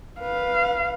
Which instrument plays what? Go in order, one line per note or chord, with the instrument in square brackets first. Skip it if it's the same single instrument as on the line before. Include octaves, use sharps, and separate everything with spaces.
[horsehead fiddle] B4 F5